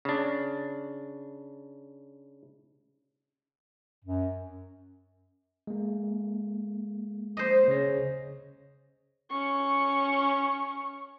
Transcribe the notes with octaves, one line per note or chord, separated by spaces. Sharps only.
C#3 D4
F#2
G#3 A#3
C5 D#5
C#3 C#5 A#6
C#4 C#6